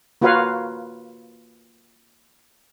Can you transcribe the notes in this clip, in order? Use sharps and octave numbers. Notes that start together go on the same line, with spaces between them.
A#3 F4 F#4 B4 C#5 F5